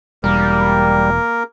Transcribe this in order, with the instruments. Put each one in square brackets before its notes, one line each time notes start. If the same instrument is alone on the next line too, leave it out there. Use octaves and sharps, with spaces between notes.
[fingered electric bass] E1 [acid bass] G3 [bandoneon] A#3 A#4